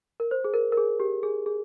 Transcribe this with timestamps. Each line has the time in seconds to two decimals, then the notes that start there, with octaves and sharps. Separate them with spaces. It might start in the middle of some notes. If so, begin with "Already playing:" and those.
0.20 A#4
0.31 C5
0.44 G#4
0.54 A#4
0.72 A#4
0.77 G#4
1.00 G4
1.23 G#4
1.46 G#4